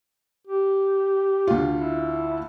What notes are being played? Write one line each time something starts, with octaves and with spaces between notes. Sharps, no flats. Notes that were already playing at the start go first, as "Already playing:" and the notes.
G4
D2 F4
E4